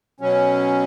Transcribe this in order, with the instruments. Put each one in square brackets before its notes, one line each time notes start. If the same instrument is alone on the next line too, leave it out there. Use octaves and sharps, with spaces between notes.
[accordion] B2 F#3 C#4